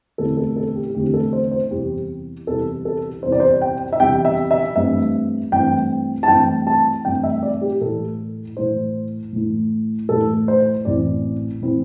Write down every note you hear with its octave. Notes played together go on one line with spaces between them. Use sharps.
E2 D3 A3 C4 E4 A4
A4
A4
G4
E2 D3 A3 C4 E4 G4
A4
C5
C5
E2 C3 E3 G3 E4 G4
E2 C3 E3 G3 E4 A4
A4
E2 C3 E3 G3 E4 C5
D5
C5
G5
E5
E2 C3 E3 G3 E4 G5
E5
E5
G2 E3 A3 C4 E5
G2 E3 A3 C4 G5
A5
G2 E3 A3 C4 G5
A5
G2 E3 A3 C4 G5
E5
D5
G4
A2 E3 A3 E4 A4
A2 E3 A3 E4 C5
A2 E3 A3 E4
A2 E3 A3 E4 A4
C5
A1 A2 E3 C4 E4 D5
A2 E3 C4 E4